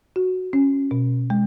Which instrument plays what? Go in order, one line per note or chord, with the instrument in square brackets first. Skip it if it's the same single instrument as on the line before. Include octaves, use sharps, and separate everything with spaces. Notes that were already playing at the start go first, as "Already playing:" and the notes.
[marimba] F#4
C#4
B2
G#3